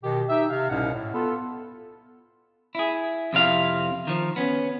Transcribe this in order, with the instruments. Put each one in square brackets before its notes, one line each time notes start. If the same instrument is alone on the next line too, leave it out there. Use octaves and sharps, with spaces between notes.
[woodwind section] B2 D#3 G4
D#4 G4 E5
C3 F5
C2 G#2 B2 C#4 F5 F#5
A2
B3 F4 A4
[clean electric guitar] E4 G#4
F2 C3 E4 F5
D#3 F3
B3 C#4